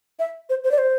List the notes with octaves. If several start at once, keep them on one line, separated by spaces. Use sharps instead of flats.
E5
C5
C5
D5
C5